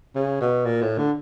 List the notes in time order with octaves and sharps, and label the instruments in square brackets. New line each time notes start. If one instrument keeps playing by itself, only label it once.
[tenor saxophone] C#3
B2
A#2
A2
D3